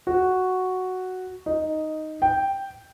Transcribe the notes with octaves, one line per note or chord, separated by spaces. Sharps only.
F#4
D#4
G5